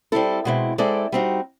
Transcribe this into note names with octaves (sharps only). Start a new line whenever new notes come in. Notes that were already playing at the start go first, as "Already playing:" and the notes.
G3 C4 E4 A4
B2 G#3 C4 E4
G#3 C4 E4 A4 D5
G3 C4 D#4 F#4